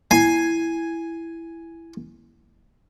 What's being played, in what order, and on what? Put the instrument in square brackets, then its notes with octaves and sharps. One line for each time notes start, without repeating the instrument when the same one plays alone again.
[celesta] E4 G#6 C7 [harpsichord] G#5